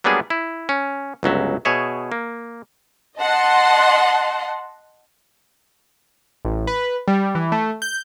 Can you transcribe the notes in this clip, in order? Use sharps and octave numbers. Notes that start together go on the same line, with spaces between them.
F#3 G3 A#3 B3 D4 G#4
E4
C#4
G1 C#2 F#3 E5
B2 G#4 C#5 E5
A#3
D#5 F#5 A5 C6
A1
B4
G3
E3
A3
G6